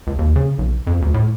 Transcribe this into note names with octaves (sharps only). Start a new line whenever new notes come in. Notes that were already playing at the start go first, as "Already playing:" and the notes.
C#2
D#2
C#3
B1
F2
D2
A2